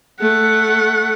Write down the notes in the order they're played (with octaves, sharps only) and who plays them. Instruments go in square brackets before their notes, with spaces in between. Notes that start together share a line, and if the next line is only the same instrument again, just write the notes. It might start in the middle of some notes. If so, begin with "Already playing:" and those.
[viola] A3 F#5